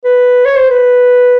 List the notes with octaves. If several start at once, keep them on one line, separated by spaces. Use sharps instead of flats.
B4
C#5
C5
B4